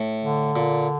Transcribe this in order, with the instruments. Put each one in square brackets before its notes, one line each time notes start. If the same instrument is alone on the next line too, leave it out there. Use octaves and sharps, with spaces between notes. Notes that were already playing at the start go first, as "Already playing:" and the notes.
Already playing: [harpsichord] A2
[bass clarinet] D3
[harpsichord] A#2